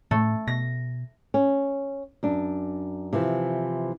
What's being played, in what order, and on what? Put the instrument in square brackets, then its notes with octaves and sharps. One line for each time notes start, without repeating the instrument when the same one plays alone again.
[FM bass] A2 [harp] A3
[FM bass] B2 [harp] A#6
[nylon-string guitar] C#4
F#2 D4
C3 E3 F3